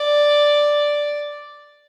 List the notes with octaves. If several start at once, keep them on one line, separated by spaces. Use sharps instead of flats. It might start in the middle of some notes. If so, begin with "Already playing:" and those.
Already playing: D5